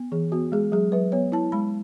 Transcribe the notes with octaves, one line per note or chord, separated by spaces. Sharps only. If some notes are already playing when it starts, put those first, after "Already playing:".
Already playing: B3
E3 G#4
B3 F#4
G#3 G#4
F#3 G#4
F#3 B4
B3 C#5
E4 A5
G#3 B5